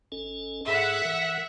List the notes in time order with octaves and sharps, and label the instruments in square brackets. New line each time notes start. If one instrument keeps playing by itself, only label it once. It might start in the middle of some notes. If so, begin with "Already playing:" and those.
[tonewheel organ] G#1 C#4 A4
[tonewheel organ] G#2 G#4 A4 [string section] E5 F#5
[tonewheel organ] E3 A#4